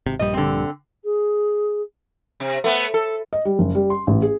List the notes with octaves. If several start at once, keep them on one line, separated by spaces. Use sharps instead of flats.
G#1 C3
A#1 G2 G3 D#5
D3 C4
G#4
C3
A3 B3
A4
D#5
G3
F#1
G3
C6
A1
G#4